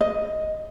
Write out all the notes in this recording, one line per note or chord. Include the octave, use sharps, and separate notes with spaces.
D#5